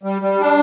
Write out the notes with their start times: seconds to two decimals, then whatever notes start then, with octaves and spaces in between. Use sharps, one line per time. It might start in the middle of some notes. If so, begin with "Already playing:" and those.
0.03 G3
0.22 G3
0.41 D4